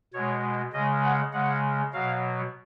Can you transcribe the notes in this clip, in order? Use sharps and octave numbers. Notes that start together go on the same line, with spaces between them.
B2 G#3 C#5
C#3 G#3 D#5
F#5
C#3 G#3 F#5
B2 F#3 F5